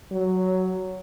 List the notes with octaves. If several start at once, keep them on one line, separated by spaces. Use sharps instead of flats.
F#3